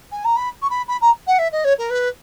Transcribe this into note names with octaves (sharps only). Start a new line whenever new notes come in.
G#5
A#5
B5
C#6
B5
B5
A#5
F#5
E5
D#5
C#5
A#4
B4